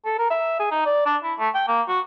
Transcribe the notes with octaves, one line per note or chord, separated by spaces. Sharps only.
A4
A#4
E5
G#4
D#4
D5
D4
E4
A3
G5
A#3
F#4